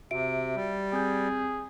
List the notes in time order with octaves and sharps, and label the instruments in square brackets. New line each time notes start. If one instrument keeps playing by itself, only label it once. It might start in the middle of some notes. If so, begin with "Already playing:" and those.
[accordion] C3 [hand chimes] F#4 E5 D7
[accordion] G3
[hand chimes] C4 G6 [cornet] G#4